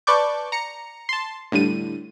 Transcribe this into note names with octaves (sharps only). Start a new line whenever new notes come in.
B4 D5 A5 C#6 D6 G6
A#5 C#7
A5 C6
A2 D3 G3 D#7